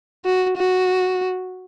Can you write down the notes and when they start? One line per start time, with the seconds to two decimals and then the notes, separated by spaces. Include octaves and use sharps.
0.25 F#4
0.57 F#4